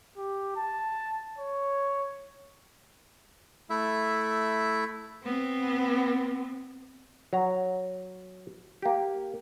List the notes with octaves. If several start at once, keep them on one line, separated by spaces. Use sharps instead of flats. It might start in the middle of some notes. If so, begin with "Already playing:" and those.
G4
A5
C#5
A3 E4 E5
B3 C4
F#3 A#5
A#3 G4